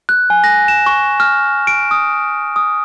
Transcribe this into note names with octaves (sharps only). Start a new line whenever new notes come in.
F#6
G#5
A#6
E7
C#6
F6
D7
D#6
D#6